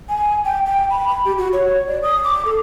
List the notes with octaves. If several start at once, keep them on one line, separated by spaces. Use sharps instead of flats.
G#5
G5
G5
B5
B5
G4
F#4
C#5
D5
D#6
D6
A4